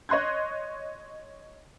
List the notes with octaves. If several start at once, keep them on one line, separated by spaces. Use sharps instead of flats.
C#5 D#5 C6 F#6 G#6